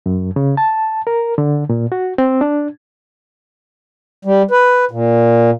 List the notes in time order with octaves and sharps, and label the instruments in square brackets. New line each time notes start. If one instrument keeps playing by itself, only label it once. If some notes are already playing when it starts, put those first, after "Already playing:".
[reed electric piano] F#2
C#3
A5
A#4
D3
A#2
F#4
C4
D4
[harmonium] G3
B4
A#2